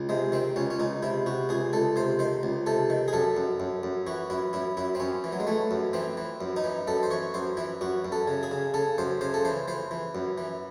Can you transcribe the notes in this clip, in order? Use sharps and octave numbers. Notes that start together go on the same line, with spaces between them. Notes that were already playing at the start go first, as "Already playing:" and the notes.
Already playing: C#2
C3 G#3
D#3 C4
C#2 C#4
C#4
C#2 D#4
C3 E4
C3 F#4
C#2 G#4
C#2 A4
C3 C5
D#3 C5
C#2
C3 A4
D#3
G#4
F#2 A4
F#2
F#2
F#2
E3 F#4
F#2 E4
F#2 E4
F#2 E4
C4
F#2 C#4
E3
F#3
G#3
E3 A3
F#2
E3 C4
E3
F#2
D#4
E3
F#2 A4
C5
E3 C#5
F#2 C5
E3 E4
F#2 F#4
F#2
A4
C#3
G#4
C#3
C#3 A4
F#2 C5
C#3 C5
A4
E3 C5
E3 C5
E3
F#2
E3